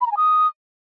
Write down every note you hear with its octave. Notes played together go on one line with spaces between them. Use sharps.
B5
A#5
G#5
D#6